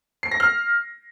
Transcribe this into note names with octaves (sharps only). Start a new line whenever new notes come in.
C7
A#6
F6